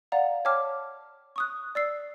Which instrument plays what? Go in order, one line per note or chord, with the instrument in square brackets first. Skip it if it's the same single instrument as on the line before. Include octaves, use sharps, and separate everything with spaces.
[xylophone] D5 F5 F#5 A#5
C#5 G5 A5 D6 F6
C#6 D#6 F#6
D5 E6 C7